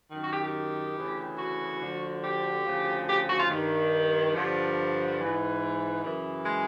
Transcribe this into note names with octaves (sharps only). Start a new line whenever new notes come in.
F#2 D#3
F#4
G4
G4
D2 C#3 E3
F#4
D2 D3 F3
G4
D2 C#3 F3
G4
F#4
F4
G2 D#3
G2 D3 F3
E3
G#2
F#2 C#3 E3
G#3